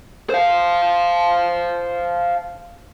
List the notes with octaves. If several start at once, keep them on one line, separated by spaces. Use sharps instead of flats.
C5 F5